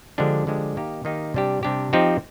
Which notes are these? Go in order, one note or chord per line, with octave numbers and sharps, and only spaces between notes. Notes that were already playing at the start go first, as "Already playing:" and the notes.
D3 F3 G#3 D4 G4
D3 F3 G#3 D4 G4
D#3 A#3 D#4 G4
D#3 A#3 D#4 G4
C3 G3 D4 G4
C3 G3 D4 G4
F3 C4 D#4 G4